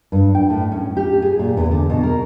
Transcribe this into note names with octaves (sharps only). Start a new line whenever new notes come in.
G2
G5
A2
C#4
G4
G#4
A#2
E2
D3
B2
A#4